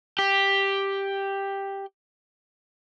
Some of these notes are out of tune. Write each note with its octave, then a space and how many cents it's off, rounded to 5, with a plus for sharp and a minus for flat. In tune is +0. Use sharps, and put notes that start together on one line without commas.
G4 +5